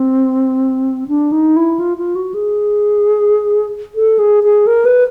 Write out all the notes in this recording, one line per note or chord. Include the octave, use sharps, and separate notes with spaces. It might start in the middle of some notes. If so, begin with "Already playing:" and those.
Already playing: C4
D4
D#4
E4
F4
F4
F#4
G#4
A4
G#4
G#4
A#4
B4